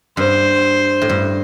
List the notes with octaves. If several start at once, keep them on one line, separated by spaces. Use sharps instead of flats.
G2 C5
A2
G2